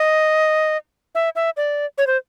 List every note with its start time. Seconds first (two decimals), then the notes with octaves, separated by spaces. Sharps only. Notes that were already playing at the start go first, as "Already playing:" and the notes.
Already playing: D#5
1.15 E5
1.36 E5
1.57 D5
1.98 C#5
2.07 C5